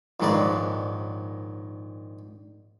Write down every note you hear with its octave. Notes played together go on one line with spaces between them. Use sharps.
A#1 G#2 D#3 C#4 B4 D5